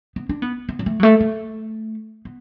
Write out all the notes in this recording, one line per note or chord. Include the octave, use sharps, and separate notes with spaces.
B3
D4
B3
B3
F#3
A3
F#3
A3
A3
B3